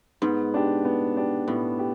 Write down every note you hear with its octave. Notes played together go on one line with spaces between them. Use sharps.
G#2 B3
D4 G4
B3
D4 G4
A2 B3
G4